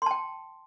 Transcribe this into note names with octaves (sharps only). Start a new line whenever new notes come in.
G5 A5 C6